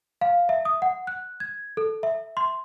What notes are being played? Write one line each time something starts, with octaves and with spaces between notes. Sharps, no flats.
F5
E5
D#6
F#5
F#6
G#6
A4
E5
C6